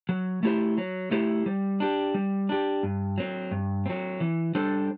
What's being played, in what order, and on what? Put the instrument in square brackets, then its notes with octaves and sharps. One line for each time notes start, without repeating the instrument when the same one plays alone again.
[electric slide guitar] F#3
A3 E4 G4 C5
F#3
A3 E4 G4 C5
G3
D4 G4
G3
D4 G4
G2
F#3 C4
G2
F#3 C4
E3
G3 D4 A4 C5